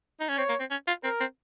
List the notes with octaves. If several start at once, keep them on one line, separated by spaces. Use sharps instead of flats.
D#4
C#4
C4 C#5
A#3
C4
C#4
F4
C4 A#4
C4